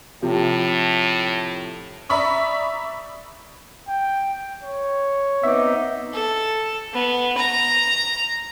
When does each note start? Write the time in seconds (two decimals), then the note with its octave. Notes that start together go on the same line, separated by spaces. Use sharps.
0.23 A2 C3 F3
2.09 D5 E5 A#5 B5 C#6 D#6
3.89 G5
4.63 C#5
5.43 B3 C4 D#4 E5 D6
6.13 A4
6.93 B3
7.37 A#5